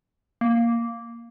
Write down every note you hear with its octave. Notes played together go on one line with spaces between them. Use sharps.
A#3